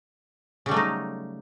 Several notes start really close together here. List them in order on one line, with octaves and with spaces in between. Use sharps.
C#3 G3 A3 F#3 D#4